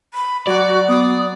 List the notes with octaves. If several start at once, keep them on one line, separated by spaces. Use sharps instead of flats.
B5
F#3 F#4 D5 F#5
B3 D#6